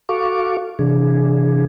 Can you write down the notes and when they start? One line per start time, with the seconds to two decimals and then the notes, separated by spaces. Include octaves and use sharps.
0.09 F#4 A4 F5 C#6 D6
0.79 C3 E3 D4 G#4